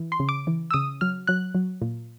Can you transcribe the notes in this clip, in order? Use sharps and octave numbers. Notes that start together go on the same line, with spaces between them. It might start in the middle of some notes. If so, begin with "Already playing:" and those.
Already playing: E3
C6
C#3
D6
E3
E6
C#3 D#6
F#3 F6
F#3 F#6
F#3
A#2